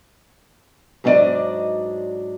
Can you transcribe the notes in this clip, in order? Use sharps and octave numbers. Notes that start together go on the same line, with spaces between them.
G#2 F#3 D4 E4 D5 D#5